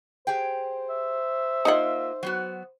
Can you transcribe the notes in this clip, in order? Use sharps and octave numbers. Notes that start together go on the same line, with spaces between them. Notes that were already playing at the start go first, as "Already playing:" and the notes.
G4 G#4 C5 G5
E5
A#3 D#4 F4 F#5
F#3 B3 F#4